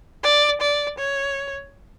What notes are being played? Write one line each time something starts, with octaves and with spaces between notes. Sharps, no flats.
D5
D5
C#5